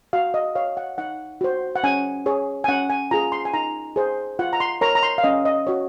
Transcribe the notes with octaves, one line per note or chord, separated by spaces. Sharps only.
F#4 F5
D#5
C#5 F5
F#5
D#4 F#5
F#4 C5
F#5
C#4 G#5
G#4 C#5
G#5
C#4 F#5
G#5
F4 G#4 A#5
C6
G#5
D#4 A#5
G#4 C5
F4 F#5
A#5
C6
A#4 C#5 A#5
A#5
C6
F5
C#4 D#5
D#5
F#4 C#5